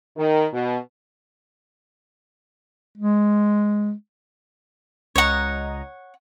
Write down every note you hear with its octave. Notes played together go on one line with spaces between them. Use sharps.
D#3
B2
G#3
C#2 C#5 D#5 F#5 A#5